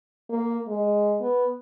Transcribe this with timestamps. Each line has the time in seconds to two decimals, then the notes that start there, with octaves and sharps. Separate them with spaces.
0.29 A#3
0.67 G#3
1.21 B3